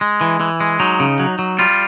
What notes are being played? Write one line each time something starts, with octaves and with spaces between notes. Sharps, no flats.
G#3
E3
E3
G#3
F#3 D#4
C#3
F#3
F#3
G3 F4